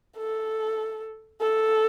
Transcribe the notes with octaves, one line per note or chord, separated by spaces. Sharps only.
A4
A4